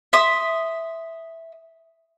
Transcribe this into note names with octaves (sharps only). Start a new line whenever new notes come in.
E5 C6 D#6